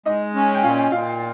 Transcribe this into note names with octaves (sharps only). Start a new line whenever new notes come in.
G#3 D#4 D#5
C#4
G5
A#2 F4 F5
A#2 F4 F5